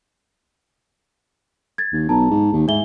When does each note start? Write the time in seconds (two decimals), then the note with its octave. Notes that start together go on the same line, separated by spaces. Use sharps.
1.78 G#6 A6
1.93 D#2
2.09 B1 A5 A#5
2.31 G#2
2.53 D#2
2.68 G#2 D#4 E5 G7